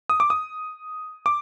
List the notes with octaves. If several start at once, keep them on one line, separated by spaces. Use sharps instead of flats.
D#6
D6
D#6
D6